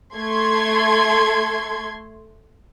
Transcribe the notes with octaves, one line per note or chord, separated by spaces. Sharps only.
A3 A4 C6 G#6